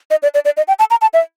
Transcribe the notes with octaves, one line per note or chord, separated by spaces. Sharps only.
D#5
D5
D5
D5
D#5
G5
A5
A#5
A5
E5